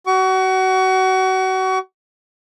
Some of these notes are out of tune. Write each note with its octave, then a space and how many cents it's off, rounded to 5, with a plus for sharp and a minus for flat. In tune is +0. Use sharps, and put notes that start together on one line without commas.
F#4 +30 C#6 +30